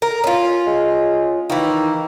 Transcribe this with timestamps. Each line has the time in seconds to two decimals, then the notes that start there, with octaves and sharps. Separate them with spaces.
0.02 A#4
0.24 C#4 F4
0.67 G#3
1.50 D#3 E3 A#3